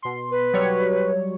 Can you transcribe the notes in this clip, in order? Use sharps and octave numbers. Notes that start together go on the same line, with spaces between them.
B2 C6
B4
F#3 G3 C#5